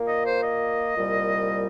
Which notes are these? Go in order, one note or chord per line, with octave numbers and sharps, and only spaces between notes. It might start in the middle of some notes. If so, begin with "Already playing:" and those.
Already playing: A#2 A#3
D#5
C5
D#5
C2 A#2 G3